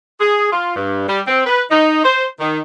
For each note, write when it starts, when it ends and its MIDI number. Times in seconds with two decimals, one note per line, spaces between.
0.21 0.52 68
0.52 0.76 65
0.76 1.06 43
1.08 1.22 55
1.27 1.46 60
1.46 1.62 71
1.71 2.02 63
2.04 2.26 72
2.40 2.60 51